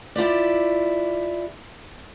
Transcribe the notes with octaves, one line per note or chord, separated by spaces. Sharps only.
E4 F4 G4 D5